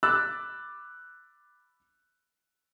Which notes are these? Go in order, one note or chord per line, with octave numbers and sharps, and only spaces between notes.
B5 D6 E6 F#6 A6